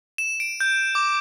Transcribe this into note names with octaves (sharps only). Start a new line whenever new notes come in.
E7
D7
G6
D6